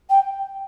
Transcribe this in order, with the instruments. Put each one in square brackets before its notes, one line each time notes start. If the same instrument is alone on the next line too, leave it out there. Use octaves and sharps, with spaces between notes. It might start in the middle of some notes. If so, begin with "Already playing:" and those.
[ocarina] G5